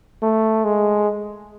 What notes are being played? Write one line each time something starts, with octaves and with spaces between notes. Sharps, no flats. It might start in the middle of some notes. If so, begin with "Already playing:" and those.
A3
G#3